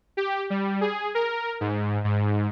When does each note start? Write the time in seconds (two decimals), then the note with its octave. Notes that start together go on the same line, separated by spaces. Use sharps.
0.17 G4
0.50 G3
0.81 G#4
1.15 A#4
1.61 G#2
2.04 G#2